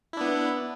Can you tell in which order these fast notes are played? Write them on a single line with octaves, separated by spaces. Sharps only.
E4 D4 B3